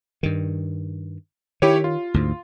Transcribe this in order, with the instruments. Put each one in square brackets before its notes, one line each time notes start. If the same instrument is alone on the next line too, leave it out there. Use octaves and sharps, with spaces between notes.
[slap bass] G2 D#3
[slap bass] D#3 [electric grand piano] E4 G4 C#5
[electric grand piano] F4
[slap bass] D2 G#2